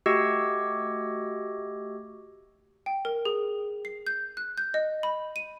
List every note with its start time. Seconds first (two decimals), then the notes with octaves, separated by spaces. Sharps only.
0.06 A3 F#4 G4 D#5 E6 G#6
2.86 G5
3.05 A#4
3.25 G#4
3.85 C7
4.07 G6
4.37 F#6
4.58 G6
4.74 D#5
5.03 B5
5.36 D#7